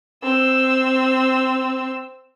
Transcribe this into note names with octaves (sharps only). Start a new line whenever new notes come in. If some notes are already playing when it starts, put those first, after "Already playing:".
C4 E6